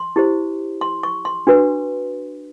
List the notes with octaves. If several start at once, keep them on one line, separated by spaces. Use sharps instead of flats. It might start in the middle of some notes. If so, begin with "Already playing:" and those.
Already playing: C6
E4 G4 C5
C6
C#6
C6
D4 F#4 B4